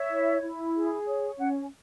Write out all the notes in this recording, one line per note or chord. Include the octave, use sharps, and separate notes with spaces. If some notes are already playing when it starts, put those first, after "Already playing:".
Already playing: C#5 E5
E4
E4
G#4
C#5
C#4 F#5